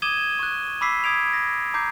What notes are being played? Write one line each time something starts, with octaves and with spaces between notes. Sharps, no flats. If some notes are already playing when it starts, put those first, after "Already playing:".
D6 D#6 G#6 D#7 E7 G7
C#6 F#6
B5 D6 E6 B6 C7
D#6 G#6 D7 F7
A#6
A#5 D6 G6 C7